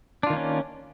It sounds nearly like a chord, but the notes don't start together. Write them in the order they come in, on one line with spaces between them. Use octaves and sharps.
D4 F4 D#3 A#3 C#4